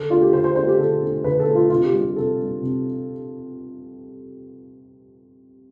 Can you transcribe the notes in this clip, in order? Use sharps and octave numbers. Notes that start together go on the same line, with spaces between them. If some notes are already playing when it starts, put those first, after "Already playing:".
Already playing: D3 A4
A3 D4 F4
G4
D3 C5
C5
A3 D4 C5
G4
D3 A4
A3 D4
D3 B4
A4
A3 D4
F4
C3 F4
G4
G3 D4
G4
C3 A4
G3 D4
C3